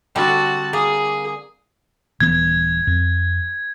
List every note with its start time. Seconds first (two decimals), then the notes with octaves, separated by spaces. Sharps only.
0.16 D3 G3 C4 F#4 A5
0.73 A#3 G#4
2.20 D#1 E3 B3 G#6
2.87 F2